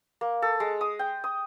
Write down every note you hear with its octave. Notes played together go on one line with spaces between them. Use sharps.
A#3
A4
G#3
D#6
G5
D#6